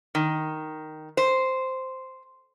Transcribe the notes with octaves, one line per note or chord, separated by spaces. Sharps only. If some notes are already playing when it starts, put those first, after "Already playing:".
D#3
C5